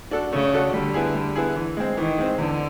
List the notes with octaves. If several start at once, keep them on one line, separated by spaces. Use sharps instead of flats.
D4 F#4 A4
C#3 A3
D4 F#4 A4
D3 G3
B3 E4 G#4
G3
B3 E4 G#4
E3
G#3 C4
D#3 E3
G#3 C4
E2 D3